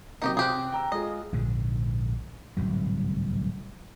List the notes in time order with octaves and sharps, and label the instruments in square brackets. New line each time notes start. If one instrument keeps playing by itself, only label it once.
[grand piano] C3 F#3 A#3 [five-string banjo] D#4 G4 D#5
[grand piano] C3 F#6 [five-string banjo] C4 G4 G#4
[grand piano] G5 A#5 E6
[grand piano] G#3 F4 G#4 [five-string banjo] D#5
[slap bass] A#1 G#2 D3
D1 C2 G#2 F#3